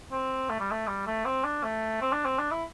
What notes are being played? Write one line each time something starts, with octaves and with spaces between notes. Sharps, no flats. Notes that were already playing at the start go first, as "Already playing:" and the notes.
C4
A3
G3
A3
G3
A3
C4
D4
A3
C4
D4
C4
D4
E4